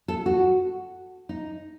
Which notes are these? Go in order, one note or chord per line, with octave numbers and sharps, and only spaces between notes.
A4
F#4
D#4